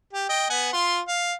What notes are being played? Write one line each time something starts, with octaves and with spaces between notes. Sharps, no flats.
G4
D#5 G5
B3 F#5 G#5
F4 C6
F5